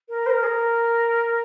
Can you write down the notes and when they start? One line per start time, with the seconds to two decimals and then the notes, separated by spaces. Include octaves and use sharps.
0.09 A#4
0.26 C5
0.30 A#4
0.43 G#4
0.47 A#4